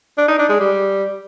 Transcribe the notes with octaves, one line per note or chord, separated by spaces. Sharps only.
D4
D#4
D4
G#3
G3